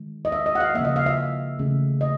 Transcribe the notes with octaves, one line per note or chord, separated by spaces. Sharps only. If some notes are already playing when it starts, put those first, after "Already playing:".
Already playing: D#3 G#3
D#5
E5
D#5
F#5
F5
C#3 F3 A#3 E5
D#5
F5
E5
C#3 E3 A3
D#5